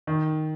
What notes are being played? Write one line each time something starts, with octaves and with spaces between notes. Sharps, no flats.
D#3